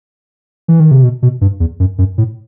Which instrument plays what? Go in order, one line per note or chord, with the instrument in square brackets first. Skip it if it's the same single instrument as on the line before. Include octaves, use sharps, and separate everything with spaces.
[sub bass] E3
D#3
C3
B2
B2
G2
E2
F#2
F#2
A2